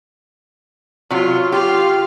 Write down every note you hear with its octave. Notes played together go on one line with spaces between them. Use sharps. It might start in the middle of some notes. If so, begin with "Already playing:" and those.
C3 F#3 F4
F4 G4 F5